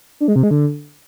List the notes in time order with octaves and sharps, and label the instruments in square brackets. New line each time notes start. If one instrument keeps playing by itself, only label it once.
[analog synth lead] D4
G#3
C3
G#3
D3